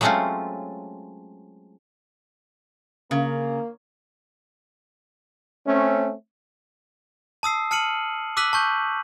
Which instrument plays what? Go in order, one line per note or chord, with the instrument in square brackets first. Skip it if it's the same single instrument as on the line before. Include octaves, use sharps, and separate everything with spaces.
[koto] F#3 G#3 A3 C4 C#4 F4
[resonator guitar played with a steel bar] C#3 [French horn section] A#3
[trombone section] A3 C4 C#4
[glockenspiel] A5 D#6 E6 C7
A5 F6 C#7 D#7 F#7
D6 E6 F#6 B6 D#7 F#7
A5 C#6 G6